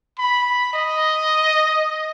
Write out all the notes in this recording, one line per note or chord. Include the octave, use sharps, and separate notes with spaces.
B5
D#5